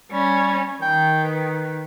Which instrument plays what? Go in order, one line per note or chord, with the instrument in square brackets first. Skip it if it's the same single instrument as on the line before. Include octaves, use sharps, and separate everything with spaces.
[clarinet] G3 [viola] C#4
[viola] D#3 [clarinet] G5
[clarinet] B4